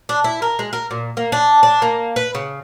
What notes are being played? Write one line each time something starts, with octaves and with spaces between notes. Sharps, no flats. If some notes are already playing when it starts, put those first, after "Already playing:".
D4
E4
A#4
G#3
A#4
A#2
A#3
D4
D4
A#3
B4
C#3